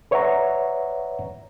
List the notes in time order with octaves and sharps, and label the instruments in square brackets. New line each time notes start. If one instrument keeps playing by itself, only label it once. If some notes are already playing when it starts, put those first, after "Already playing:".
[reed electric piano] B4 C#5 D5 E5 F#5 A#5